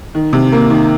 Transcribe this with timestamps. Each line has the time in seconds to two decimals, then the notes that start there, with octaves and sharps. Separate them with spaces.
0.15 D#3
0.33 C3
0.52 A#3
0.70 D#3